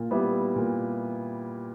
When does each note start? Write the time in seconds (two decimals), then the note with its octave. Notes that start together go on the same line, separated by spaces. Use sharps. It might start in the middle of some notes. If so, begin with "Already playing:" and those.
Already playing: A#2
0.11 G3 B3 E4
0.56 A#2